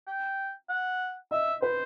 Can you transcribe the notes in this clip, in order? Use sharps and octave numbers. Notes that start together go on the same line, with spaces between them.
G5
F#5
D#5 E5
B4 C5